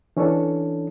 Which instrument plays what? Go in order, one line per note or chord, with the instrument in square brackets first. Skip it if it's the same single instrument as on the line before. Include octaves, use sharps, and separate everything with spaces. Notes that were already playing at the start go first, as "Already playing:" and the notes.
[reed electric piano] E3 C#4 D4 A4